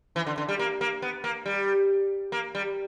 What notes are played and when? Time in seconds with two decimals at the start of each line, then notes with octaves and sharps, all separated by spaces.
0.16 E3
0.27 D3
0.38 D3
0.49 G3
0.59 A#3
0.81 A#3
1.02 B3
1.24 A#3
1.46 G3
2.32 A#3
2.55 G3